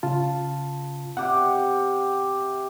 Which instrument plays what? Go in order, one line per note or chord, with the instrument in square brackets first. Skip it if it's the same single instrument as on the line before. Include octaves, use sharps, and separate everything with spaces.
[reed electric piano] C#3 F4 A5
[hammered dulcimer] C3 G4 [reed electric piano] F#5